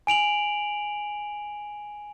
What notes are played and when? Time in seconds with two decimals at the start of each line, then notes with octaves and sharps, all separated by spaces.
0.07 G#5 D7 F7 F#7